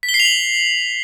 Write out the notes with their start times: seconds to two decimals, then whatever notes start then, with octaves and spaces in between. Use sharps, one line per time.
0.03 B6
0.09 G7
0.14 C7
0.20 F7
0.25 F#7